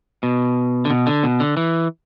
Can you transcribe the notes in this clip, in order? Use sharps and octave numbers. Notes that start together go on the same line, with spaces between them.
B2
D3
B2
D3
B2
D3
E3